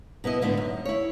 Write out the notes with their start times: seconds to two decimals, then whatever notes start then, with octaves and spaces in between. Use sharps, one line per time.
0.24 B2 B3 E4 D#5
0.42 G#2 D3 A3 B3
0.57 F#2
0.85 E4 C#5